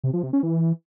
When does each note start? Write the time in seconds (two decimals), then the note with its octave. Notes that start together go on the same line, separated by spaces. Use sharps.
0.04 C3
0.13 F3
0.23 C3
0.33 C#4
0.43 E3